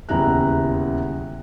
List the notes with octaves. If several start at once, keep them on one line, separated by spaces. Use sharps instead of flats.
D#1 E2 C#3 E4 A#5 F#6